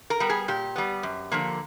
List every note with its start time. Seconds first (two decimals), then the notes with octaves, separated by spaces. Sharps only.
0.10 A#4
0.20 G3 B3
0.30 G#4
0.48 A#2 G4
0.76 G3 B3
1.03 F#2
1.31 D3 F3 A#3